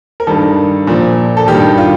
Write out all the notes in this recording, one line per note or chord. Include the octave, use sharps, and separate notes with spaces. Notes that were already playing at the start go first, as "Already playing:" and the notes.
A#4
G2 D#3 A4
A#2 F3
A4
G2 D#3 G4
F4